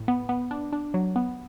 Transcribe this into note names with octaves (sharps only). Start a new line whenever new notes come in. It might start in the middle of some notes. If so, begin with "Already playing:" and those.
Already playing: A2
B3
B3
D4
D4
F#3
B3